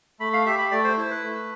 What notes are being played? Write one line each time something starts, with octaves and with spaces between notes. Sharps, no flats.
A3 B5
F5
G4 E5
B5
A3 D5
C5
E4 C5
B4
A3